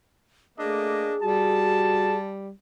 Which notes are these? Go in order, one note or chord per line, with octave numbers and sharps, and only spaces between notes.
A3 A#3 D4 G#4 D#5
G3 F#4 A5